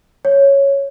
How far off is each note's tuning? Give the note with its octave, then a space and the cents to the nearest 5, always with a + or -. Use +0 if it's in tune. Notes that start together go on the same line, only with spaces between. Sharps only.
C#5 +0